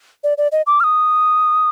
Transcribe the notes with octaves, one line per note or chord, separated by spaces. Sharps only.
D5
D5
D#5
D6
F6
D#6